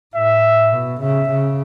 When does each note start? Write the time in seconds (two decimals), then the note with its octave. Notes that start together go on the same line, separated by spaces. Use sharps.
0.15 A2 E5
0.72 B2
1.01 C#3 E5
1.29 C#3